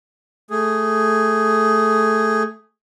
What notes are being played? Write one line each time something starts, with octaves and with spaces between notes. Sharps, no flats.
A3 G#4